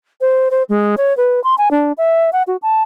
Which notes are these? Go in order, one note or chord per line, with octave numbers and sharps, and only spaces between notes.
C5
C5
G#3
C#5
B4
C6
G#5
D4
E5
F#5
F#4
A5